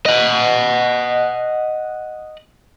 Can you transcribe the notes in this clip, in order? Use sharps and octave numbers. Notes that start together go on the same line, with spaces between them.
D#5 F#5